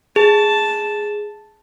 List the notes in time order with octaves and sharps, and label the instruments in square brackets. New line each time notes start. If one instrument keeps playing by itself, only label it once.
[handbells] G#4 [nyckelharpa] A5